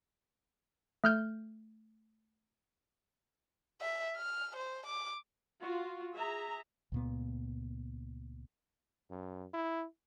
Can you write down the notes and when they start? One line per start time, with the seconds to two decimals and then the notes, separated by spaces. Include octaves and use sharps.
1.04 A3 F6 G6
3.81 E5
4.17 F6
4.56 C5
4.87 D6
5.62 F4 F#4
6.15 G#4 E5 A#5
6.92 C#2 A#2 B3
9.10 F#2
9.54 E4